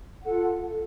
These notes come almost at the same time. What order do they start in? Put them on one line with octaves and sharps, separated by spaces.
F#5 A4 F4